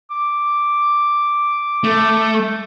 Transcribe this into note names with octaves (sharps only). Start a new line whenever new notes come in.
D6
A3